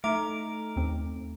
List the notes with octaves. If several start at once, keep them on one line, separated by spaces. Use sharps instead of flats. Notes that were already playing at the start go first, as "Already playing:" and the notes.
A3 D#4 A#4 E5 D6
D#2 C4